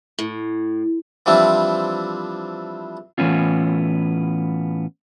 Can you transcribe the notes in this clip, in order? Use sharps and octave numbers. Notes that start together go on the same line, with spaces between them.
A2
E3 F3 G3 C4 D4 E4
A2 E3 A#3 B3 C#4 F4